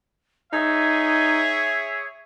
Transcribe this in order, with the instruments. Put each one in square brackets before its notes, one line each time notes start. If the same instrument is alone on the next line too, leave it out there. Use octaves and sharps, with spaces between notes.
[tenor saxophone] D#4 [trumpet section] G#4 C#5 E5 [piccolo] G#6